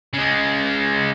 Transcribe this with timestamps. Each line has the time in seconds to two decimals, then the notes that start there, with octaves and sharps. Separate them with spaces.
0.13 C#3 G#3